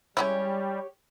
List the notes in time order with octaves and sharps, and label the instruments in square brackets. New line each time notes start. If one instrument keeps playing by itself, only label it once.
[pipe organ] G3 [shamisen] G#3 C#4 E4 [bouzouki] G4 C#5